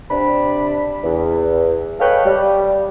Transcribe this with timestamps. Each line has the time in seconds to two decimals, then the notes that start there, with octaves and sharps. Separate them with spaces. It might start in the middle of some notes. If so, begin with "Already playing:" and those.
0.11 C3 D4 B5
1.04 E2
2.00 A4 B4 C#5 D#5 F5 G5
2.25 G3